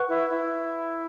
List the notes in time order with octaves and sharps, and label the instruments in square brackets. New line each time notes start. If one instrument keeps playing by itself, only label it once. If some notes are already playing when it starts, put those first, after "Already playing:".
Already playing: [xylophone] B4 F#5 C#6 F#6
[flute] E4
E4